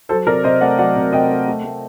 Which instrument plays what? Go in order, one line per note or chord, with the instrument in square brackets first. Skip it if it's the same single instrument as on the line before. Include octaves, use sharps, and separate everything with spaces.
[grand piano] F#3 A4 C5
C3 A#4 D5
C3 C5 D#5
A3 D5 F#5
F#3 D5 F#5
C3
C3 D#5 G5
A3
A3
A3